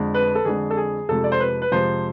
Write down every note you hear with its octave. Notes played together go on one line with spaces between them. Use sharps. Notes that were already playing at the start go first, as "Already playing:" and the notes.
Already playing: F2 D3 G#3
B4
A4
F2 D3 G#3 G#4
A4
G#4
F2 C3 F3 G#3 A4
D5
C5
B4
B4
F2 C3 F3 G#3 C5